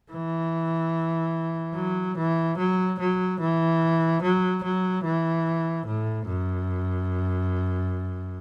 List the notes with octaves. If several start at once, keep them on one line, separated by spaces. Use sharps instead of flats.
E3
F#3
E3
F#3
F#3
E3
F#3
F#3
E3
A2
F#2